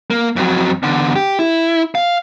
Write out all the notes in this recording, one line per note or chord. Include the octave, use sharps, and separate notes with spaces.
A#3
F2 F#3
E2 D3
G4
E4
F5